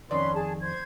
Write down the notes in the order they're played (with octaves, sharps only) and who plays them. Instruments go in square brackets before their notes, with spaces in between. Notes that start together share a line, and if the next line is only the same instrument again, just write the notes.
[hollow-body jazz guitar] F2 D#3 D5 [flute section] C#4 B4 C6
[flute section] G#4 A5
C5 G#6